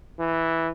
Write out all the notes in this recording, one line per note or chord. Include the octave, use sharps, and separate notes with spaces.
E3